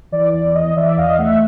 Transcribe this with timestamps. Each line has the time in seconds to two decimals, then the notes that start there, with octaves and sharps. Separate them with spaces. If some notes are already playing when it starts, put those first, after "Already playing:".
0.12 E3 D5
0.33 E2 D5
0.54 E3 D#5
0.76 E3 D5 E5
0.97 E2 D#5 F5
1.18 A3 E5 F#5